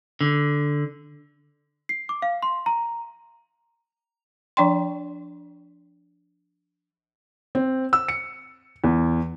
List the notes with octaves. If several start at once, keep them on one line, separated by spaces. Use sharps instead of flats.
D3
C7
D6
F5
C6
A#5
F3 D4 D5 G5 C6
C4
E6
C#7
E2